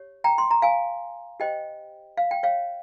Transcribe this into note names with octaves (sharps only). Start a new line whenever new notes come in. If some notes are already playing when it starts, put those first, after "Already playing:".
Already playing: G4 C#5
G5 A#5
C6
A#5
F5 G#5
G4 C5 D#5 G5
F5
G5
C#5 F5